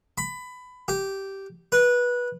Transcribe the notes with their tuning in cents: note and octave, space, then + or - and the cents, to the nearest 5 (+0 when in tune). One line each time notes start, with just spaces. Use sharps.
B5 +20
G4 -10
B4 -20